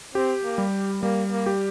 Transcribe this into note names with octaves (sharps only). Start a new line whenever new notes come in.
C4 G4
A#3
G3
G3 A#3
A#3
G4